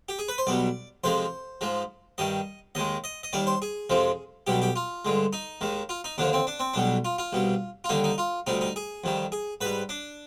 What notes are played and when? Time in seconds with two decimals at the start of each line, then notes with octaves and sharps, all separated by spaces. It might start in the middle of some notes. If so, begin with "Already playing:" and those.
0.09 G4
0.19 G#4
0.28 B4
0.38 C5
0.47 B1 B2 G3 D5
1.04 F2 C3 F3 G#3 C5
1.61 G#2 F3 G#3
2.18 G2 D#3 G3 D#5
2.75 D#2 D#3 G#3 D#5
3.04 D#5
3.23 D#5
3.33 D#2 D#3 G3 D5
3.47 C5
3.62 G#4
3.90 F2 C3 F3 G#3
4.47 B1 B2 G3 G4
4.62 G4
4.76 F4
5.05 G2 D3 G#3
5.33 D#4
5.61 D#2 D#3 G#3
5.89 F4
6.04 D#4
6.18 D#2 D3 F3 D4
6.33 C4
6.47 D4
6.60 C4
6.74 B1 B2 G3 D4
7.05 F4
7.18 F4
7.33 C2 B2 G3
7.84 F4
7.89 D#2 D3 G3 D#4
8.04 D#4
8.18 F4
8.47 D2 C3 G3 D#4
8.61 D#4
8.76 G#4
9.04 F2 D#3 G3
9.32 G#4
9.61 G#2 G3 B4
9.89 D4